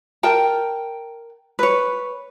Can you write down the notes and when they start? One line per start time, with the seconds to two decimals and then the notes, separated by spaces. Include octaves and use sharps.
0.23 A#4 G5 A5
1.59 B4 C#5